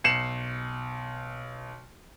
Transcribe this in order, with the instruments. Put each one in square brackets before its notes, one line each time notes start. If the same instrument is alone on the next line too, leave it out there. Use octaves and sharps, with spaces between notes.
[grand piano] B1 C7 C#7 E7 F#7